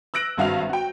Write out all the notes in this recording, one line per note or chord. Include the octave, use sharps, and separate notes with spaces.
E6 F#6 A#6 D7 F#7
G#1 G2 F#4 E5 F5 F7
F#4 G5